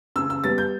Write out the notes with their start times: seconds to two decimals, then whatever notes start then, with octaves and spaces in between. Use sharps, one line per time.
0.16 C#3 E6
0.30 E6
0.44 G3 B3 A6
0.58 G6